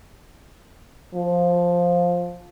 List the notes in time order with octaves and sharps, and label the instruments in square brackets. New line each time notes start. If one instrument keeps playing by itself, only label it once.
[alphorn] F3